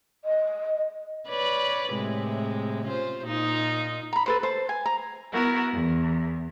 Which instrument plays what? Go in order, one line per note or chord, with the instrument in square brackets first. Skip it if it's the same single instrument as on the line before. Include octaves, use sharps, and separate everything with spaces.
[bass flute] D#5
[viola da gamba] B4 C#5 D5
A2 C3 G#3
C#4 F4 C5
A#2 D#4 F4
[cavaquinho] A#5 B5
A4 B4 C5
C5 A5
G#5
A#5
[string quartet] B3 E4 F#4 A#4
E2